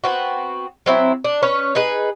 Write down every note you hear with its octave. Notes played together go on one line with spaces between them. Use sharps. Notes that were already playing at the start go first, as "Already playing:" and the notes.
B3 C4 F#4
F#3 C4 E4
D4
C#4 B4 C#5
D#4 G#4 B4